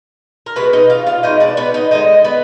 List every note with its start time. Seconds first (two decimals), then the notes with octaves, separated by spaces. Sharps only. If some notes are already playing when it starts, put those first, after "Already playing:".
0.46 A#4
0.56 B2 G#3 B3 B4
0.73 D#4 D#5
0.90 F4 F5
1.07 F4 F5
1.23 B2 G#3 D#4 D#5
1.40 D4 D5
1.57 B3 B4
1.74 D#4 D#5
1.91 D3 F3 G#3 D#4 D#5
2.24 B3 B4